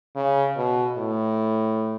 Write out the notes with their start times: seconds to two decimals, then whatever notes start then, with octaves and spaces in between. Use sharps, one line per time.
0.16 C#3
0.57 B2
0.98 A2